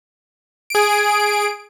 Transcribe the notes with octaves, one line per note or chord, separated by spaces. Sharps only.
G#4 D7